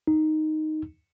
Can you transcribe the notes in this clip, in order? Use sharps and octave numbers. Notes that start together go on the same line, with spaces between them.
D#4